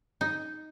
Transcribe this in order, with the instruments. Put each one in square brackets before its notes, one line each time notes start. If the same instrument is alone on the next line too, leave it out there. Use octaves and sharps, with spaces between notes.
[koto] D#4